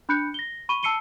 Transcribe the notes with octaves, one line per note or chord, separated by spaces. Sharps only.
D4 B5 F#6 G6 C#7
A#6 G7
B5 C#6 D#7 G7
A5 E6 C7 C#7 D#7 G7